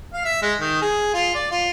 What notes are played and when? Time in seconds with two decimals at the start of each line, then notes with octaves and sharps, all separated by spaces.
0.13 F5
0.25 E5
0.42 G#3
0.60 D#3
0.82 G#4
1.14 F4
1.35 D5
1.52 F4